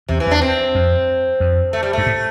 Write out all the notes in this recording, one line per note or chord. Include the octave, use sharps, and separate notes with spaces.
E2 C3
E3
E2 D4
C4
F2
F2
A3
G3
G2 A3
A2